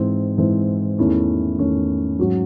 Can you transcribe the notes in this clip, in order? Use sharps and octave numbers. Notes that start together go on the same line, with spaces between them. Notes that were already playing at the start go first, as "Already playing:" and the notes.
Already playing: G#2 E3 C4
G#2 E3 C4
E2 D#3 A3 C#4 E4
E2 D#3 A3 C#4 E4
G#2 F#3 C#4 F#4